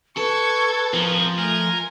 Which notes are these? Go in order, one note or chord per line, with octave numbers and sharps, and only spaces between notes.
A4 B4 C#6 G#6
F3 C4 G#4 A#4
A3 A#4 G#5